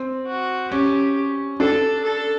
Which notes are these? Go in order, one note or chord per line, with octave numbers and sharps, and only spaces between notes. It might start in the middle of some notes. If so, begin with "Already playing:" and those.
Already playing: C4
F#4
C#4 G4
D4 A4
A4